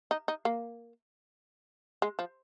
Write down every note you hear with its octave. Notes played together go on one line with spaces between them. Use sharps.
D#4
D#4
A#3
G#3
F3